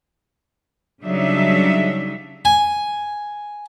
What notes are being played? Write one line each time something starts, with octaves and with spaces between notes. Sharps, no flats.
C#3 F#3 G3 D4 D#4 E5
G#5